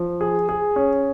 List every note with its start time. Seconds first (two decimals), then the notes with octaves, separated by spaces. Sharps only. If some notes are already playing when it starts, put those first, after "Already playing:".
Already playing: F3
0.21 G#4
0.49 G#4
0.76 C#4